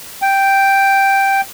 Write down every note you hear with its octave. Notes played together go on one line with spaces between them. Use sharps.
G5